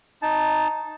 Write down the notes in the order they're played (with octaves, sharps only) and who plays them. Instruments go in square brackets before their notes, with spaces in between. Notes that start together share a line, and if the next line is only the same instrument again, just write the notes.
[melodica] D#4 A5